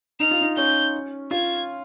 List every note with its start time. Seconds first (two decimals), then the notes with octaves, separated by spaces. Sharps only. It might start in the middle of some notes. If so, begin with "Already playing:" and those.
0.20 D#4 F6
0.31 F4
0.41 D#4
0.57 C#4 G6
1.31 F4 G#6